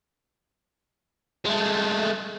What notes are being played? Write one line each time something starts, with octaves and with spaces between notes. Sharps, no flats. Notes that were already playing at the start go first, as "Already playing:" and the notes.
G#3 A3